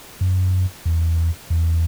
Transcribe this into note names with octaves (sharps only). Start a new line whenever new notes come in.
F#2
E2
E2